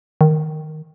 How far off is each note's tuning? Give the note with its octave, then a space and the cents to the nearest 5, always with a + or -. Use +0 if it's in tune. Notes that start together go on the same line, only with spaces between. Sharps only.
D#3 -5